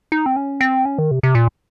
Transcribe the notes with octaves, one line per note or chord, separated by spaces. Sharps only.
D#4
C4
C#4
C4
C#4
D#3
C3
C3
A#2